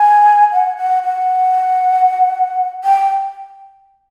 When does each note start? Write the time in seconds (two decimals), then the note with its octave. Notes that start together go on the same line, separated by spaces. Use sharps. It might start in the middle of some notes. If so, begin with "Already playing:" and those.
Already playing: G#5
0.52 F#5
0.77 F#5
1.04 F#5
2.84 G5